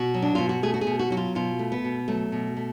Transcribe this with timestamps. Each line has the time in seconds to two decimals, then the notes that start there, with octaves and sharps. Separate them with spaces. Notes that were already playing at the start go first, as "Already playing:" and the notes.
Already playing: B2 F#4
0.14 F#3
0.22 D4
0.35 B2 F4
0.49 F#4
0.63 A3 G#4
0.74 F#4
0.81 G#4
0.87 B2
0.99 F#4
1.10 F#3 F#4
1.17 F4
1.35 B2 F4
1.59 A3
1.72 B3
1.84 B2
2.07 F#3 A3
2.32 B2
2.57 A3